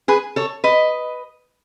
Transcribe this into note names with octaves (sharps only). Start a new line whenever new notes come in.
G#4 B4
A4 C#5
B4 D#5